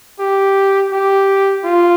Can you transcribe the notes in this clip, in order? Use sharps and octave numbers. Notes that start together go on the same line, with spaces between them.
G4
G4
F4